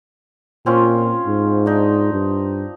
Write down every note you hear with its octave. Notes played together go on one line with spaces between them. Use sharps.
A#2 C4 C#4 F4
G#2
D4 D#4
G2